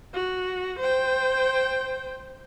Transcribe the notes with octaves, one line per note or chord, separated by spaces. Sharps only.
F#4
C5 G5